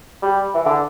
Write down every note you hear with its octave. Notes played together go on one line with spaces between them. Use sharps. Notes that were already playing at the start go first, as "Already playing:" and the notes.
G3
E3
D3